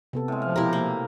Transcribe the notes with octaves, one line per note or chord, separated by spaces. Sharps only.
C3 B3 A4
A2 G#3
F3 F5
B2 E4 G4 A#4 C5
A#3